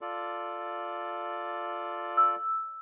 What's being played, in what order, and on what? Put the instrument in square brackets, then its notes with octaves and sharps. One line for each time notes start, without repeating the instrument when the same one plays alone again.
[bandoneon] F4 A4 D5
[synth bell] E6